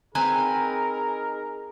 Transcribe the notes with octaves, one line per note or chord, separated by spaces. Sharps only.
C4 D#4 G#4 A#4 B4 G#5 A#5